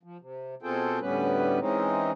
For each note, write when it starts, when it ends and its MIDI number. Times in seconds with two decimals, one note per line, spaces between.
0.03 0.17 53
0.21 0.55 48
0.63 0.99 47
0.63 0.99 60
0.63 0.99 65
0.63 0.99 68
0.63 0.99 69
0.63 0.99 79
1.00 1.59 38
1.00 1.59 45
1.00 1.59 55
1.00 1.59 59
1.00 1.59 61
1.00 1.59 71
1.59 2.11 52
1.59 2.11 56
1.59 2.11 60
1.59 2.11 61
1.59 2.11 63